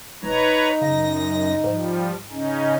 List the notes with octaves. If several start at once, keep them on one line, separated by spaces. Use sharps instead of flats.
E1 D#4 B4 C#5 A#5
F#2 C#3 A#6
G#2 F3 G3
C#3 C#4 D#4